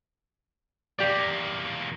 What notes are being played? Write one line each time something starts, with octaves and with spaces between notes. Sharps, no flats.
E2 A#3 G4 D5